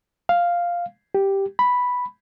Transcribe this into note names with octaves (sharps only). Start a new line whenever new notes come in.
F5
G4
B5